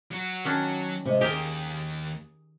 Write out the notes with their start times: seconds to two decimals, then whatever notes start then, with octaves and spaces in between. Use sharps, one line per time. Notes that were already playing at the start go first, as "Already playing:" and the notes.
0.11 F#3 F#4
0.45 D#3 C#4 D4
1.05 C3 G#3
1.21 D#2 G4 G#4 A#4